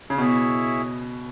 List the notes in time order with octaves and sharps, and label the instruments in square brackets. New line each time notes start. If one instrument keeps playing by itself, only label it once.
[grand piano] C#3
[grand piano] B2 [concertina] E4 G#4 C#5 E5